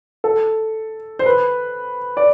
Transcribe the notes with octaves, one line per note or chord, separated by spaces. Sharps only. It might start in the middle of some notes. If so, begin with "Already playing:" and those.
A4
C5
B4
D5